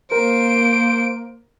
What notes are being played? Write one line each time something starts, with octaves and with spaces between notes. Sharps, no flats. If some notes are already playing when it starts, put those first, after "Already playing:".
A#3 A#4 C5 D7